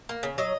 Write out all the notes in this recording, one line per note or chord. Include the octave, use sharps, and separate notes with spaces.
A#3
C#3
F#3 D#5